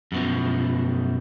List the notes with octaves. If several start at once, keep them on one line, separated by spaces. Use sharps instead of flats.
F#2 B2 F3